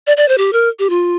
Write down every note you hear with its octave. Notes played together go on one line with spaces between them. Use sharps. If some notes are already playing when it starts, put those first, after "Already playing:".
D5
D5
C5
G4
A#4
G4
F4